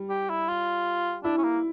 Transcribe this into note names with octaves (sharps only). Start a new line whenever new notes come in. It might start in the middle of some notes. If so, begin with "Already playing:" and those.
Already playing: G3
G4
E4
F4
D4 E4
C#4
A#3